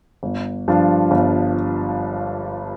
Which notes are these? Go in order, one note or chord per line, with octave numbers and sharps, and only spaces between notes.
G1
G2 F3 D4 F4
G1